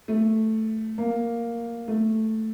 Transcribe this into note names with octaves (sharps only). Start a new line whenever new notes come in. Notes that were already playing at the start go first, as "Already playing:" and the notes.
A3
A#3
A3